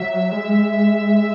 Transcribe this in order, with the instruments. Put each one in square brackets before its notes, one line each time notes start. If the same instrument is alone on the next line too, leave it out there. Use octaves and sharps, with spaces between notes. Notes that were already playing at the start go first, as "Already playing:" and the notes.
Already playing: [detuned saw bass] F#3 [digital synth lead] E5
[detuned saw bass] G#3